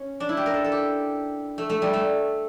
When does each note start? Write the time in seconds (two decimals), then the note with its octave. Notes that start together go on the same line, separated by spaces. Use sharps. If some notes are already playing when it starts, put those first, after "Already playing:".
Already playing: C#4
0.20 D4
0.29 E4
0.37 G4
0.46 A#4
0.54 A4
0.64 A4
0.72 G4
1.58 A3
1.69 A3
1.82 G3
1.93 A3